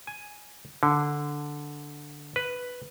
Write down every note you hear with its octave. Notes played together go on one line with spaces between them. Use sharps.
G#5
D3
B4